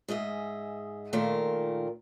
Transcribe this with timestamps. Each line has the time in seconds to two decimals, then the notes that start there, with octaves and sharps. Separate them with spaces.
0.08 G#2 G#4 D#5 E5
1.13 A#2 D#3 A3 F4 A#4